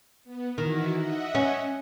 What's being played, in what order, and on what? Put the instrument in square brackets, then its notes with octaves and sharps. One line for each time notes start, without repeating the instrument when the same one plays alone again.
[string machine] B3
[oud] D#3 [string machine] E3 E4 F#4
[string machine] D#5 E5 F#5
[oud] C#4